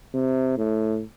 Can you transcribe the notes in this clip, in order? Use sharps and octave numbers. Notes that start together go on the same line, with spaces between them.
C3
A2